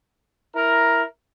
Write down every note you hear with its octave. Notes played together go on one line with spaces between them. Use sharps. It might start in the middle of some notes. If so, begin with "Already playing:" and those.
E4 A#4